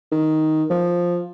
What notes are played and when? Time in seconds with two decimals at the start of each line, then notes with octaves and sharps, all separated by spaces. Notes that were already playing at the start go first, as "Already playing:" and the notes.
0.12 D#3
0.70 F3